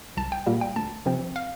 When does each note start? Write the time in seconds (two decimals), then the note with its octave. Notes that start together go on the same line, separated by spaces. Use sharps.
0.17 C2 A5
0.32 G5
0.46 A#2 G3 A#3
0.61 G5
0.76 D2 A5
1.06 C3 F3 C4
1.36 F5